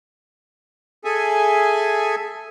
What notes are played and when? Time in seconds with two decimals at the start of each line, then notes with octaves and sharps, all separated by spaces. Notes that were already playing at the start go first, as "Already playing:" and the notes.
1.05 G#4 A4 E5 G#5